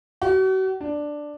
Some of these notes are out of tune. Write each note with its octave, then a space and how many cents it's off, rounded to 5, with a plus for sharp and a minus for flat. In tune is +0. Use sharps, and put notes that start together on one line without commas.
F#4 +40
D4 +5